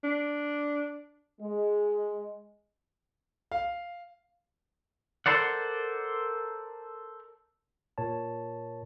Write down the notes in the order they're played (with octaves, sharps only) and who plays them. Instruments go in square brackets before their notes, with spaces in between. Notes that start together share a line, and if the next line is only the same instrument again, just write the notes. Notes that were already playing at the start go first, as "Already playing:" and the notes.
[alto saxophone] D4
[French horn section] G#3
[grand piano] F5
[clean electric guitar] A4 A#4 C5 D5 F#5
[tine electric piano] A#2 A#4 C#5 A5